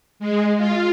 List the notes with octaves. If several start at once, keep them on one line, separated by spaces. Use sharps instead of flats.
G#3
F4